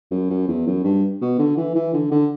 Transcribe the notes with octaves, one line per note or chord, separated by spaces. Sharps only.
F#2
F#2
E2
F#2
G2
B2
D3
E3
E3
D3
D3